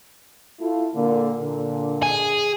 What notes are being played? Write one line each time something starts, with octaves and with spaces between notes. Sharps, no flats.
A3 E4 F4
A#2 D3 A#3
A#2 D3
G#4